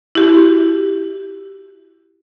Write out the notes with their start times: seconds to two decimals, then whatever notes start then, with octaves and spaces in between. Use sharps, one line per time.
0.15 E4 F#4 G4